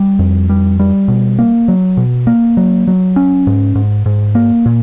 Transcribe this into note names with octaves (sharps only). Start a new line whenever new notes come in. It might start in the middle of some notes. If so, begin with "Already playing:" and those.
Already playing: G3
F2
G3
G3
B2
A#3
F#3
B2
A#3
F#3
F#3
C#4
G#2
G#2
G#2
A#3
A#2